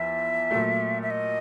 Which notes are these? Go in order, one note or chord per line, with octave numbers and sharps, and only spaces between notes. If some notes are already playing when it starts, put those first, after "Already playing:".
Already playing: E2 F3 E5
A#2 F#3 A3
E5
D#5